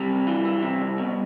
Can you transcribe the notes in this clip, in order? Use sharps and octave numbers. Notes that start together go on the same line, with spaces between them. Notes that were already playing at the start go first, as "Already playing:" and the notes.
Already playing: C3 G3
C2
E3
E3
C3
C2
B2